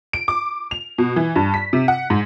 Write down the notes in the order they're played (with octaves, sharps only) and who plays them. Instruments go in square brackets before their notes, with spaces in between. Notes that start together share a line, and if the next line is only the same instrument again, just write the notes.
[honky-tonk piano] D7
D6
F7
B2
E3
G2
B6
C3
F#5
G#2